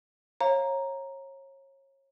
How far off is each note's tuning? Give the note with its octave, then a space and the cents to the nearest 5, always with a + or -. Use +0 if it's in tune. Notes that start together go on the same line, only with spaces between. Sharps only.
C#5 -30 F5 +0 A#5 +0